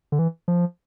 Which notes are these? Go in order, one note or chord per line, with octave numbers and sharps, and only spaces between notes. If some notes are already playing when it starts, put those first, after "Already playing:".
D3
E3
F3